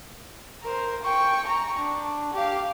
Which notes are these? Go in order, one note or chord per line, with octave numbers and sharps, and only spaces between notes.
A#4 C5
G5 C#6
A#5 C#6
D4
G4 F5